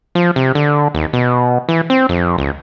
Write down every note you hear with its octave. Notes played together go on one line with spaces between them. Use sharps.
F3
C3
D3
D#2
B2
E3
C4
F2
C#2